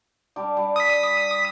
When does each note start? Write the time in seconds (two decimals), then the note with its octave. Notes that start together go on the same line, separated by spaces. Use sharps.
0.36 G3 D4 D6
0.57 G3
0.76 D#6 B6